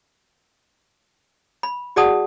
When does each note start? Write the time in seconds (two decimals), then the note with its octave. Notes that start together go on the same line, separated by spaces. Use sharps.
1.63 B5
1.96 F#4 G#4 D5 F#5 A5 D#6